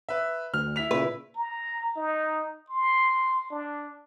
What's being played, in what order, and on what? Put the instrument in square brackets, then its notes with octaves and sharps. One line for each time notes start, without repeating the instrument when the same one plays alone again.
[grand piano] B4 E5
[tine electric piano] D2 [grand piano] F6
[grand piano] E4 B6 F7
[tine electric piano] A#2 C#3 [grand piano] E4 [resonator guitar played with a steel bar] B4
[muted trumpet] A#5
D#4
C6
D4